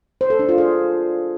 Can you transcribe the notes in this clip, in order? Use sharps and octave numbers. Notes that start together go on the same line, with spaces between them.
C5
A4
D4
F4
G#4